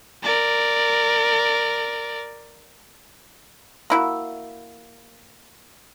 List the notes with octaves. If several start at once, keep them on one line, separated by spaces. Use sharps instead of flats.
A#4 D5
A#3 E4 F#4